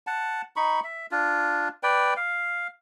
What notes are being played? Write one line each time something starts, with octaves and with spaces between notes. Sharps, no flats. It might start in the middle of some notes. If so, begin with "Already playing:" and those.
F#5 A5
D#4 B5 C#6
E5
D4 F4
B4 D5 G5
F5